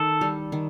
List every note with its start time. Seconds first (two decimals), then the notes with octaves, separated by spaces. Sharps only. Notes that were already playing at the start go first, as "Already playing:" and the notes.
Already playing: D#3 A4
0.21 G3
0.52 D#3